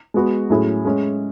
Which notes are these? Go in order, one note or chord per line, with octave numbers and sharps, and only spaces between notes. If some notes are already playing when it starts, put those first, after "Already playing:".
G#3 B3 F#4
A2 F#3 C#4 E4 G#4
G#3 C#4 G#4